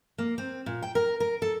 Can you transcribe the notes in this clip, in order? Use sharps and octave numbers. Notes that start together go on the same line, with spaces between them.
A#3
C4
A#2
G5
A#4
A#4
A4